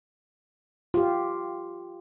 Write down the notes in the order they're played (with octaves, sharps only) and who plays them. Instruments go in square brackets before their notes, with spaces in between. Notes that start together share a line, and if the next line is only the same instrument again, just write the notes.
[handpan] F4 G4